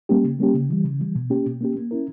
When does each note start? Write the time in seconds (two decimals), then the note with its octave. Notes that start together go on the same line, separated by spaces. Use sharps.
0.09 G3 A#3 C#4 G4
0.24 C#3
0.39 G3 A#3 C#4 G4
0.54 C#3
0.69 E3 G3
0.85 C#3
0.99 E3 G3
1.15 B2
1.30 A#3 C#4 G4
1.46 B2
1.61 A#3 C#4 G4
1.76 A#3
1.91 C#4 E4 A#4